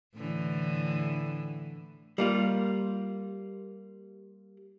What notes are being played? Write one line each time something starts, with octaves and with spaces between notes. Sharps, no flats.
A2 D3 E3
G3 A#3 F4